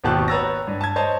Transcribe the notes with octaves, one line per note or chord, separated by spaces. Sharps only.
G#1 D#2 B2 G4 A5 F#6
B4 C#5 A#5 E6 A6 A#6
G2
A5 G#6
C5 C#5 D#5 A5